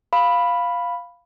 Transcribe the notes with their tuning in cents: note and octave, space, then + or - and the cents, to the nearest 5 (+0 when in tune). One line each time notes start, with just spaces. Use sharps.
F5 +0 B5 +0